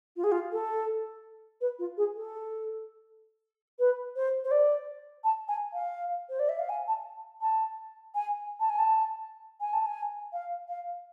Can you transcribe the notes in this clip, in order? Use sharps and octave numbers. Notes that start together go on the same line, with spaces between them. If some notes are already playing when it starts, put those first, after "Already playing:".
F4
G#4
F4
A4
B4
F4
G#4
A4
B4
C5
C5
D5
A5
G#5
F5
C5
D5
E5
F5
G#5
A5
A5
G#5
A5
G#5
A5
G#5
A5
G#5
F5
F5